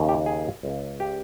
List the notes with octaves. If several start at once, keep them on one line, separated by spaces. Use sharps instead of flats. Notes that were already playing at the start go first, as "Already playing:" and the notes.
Already playing: D#2 C#3
G4
G#4
C#2 C#3
G4